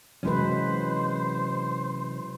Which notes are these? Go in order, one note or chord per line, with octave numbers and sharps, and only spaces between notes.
C3 E3 F#3 G#3 C#4 B4 C5